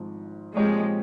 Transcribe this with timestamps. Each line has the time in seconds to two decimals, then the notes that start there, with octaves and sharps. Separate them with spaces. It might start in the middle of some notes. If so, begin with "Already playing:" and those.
Already playing: G#1 G#2 F3
0.56 A#2 F3 G#3 C4 G4 C#5